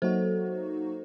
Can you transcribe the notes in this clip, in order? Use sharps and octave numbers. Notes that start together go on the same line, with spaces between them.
F#3 A#3 D#4 F#4 A4 C5